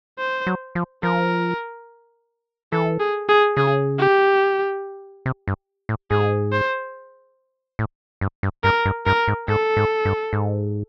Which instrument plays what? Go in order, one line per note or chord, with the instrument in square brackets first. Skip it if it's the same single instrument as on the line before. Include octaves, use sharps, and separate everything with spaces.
[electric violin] C5
[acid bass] F#3
F3
[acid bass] F3 [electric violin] A#4
[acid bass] E3 [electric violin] A4
[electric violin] G#4
G#4
[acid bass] C#3 [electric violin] G#4
[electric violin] G4
[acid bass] C3
G2
A2
[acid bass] G#2 [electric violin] G#4
[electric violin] C5
[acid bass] A2
G2
G2
[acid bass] G2 [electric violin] A#4
[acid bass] G2
[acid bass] G2 [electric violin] A#4
[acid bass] G#2
[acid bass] G#2 [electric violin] A4
[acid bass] G#2
G2
G#2